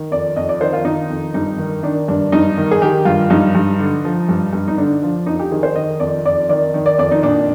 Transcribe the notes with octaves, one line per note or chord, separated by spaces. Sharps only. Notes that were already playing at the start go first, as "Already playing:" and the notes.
Already playing: D#3
F2 D5
F2 D#5
D5
D#3 C5
F4
D#3 D#4
F2
G2 D#4
D#3
D#3 D4
G2 D4
G2 D#4
D#3
G#4
D#3 G4
G2 F4
G2 D#4
G2
D3
F3
G2
G2
D#4
D3 D4
F3
F2 D#4
G4
D#3 G#4
C5
D#3 D#5
F2 D5
F2 D5
D#3 D5
D#3
D5
F2 D5
D#4
A#2 D4